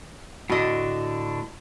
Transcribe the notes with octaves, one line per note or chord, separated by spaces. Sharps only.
A2 D3 D4 F#4 D#5